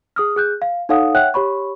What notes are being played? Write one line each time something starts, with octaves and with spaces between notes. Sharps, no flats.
G#4 D#6 F6
G#4 F#6 G6
F5
D#4 A4 C#5 F5 F#5 D#6
C#5 E5 F#5 G5 F#6
G4 C#5 B5 C#6